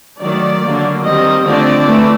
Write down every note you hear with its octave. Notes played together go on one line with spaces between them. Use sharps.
D#3 F#3 A3 D5
D3 F#3 A#3
D#3 G3 C4 D#5
D3 F3 A3 C4 D5
E3 A3